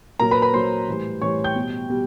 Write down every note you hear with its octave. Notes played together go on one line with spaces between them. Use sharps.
A#2 F#3 A#4 A#5
B4 B5
B4 B5
A#2 F#3 C5 C6
A2 E3 G3
A2 E3 G3 C#5 C#6
G5 G6
B2 G3
B2 G3